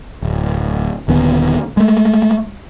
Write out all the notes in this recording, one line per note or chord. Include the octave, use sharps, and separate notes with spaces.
D1
D#1 D#2 D3 B3
G#3 A3